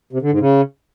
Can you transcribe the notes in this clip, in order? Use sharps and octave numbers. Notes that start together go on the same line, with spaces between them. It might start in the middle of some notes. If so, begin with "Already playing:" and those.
C3
D3
G#2
C#3